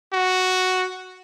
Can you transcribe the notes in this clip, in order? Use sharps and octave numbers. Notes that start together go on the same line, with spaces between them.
F#4